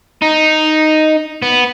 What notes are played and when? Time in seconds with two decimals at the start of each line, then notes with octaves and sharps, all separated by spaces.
0.22 D#4
1.42 B3